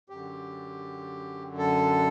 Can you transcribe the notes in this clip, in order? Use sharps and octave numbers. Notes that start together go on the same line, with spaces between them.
F#2 D3 G4
A4